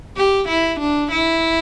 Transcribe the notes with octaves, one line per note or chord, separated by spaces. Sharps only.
G4
E4
D4
E4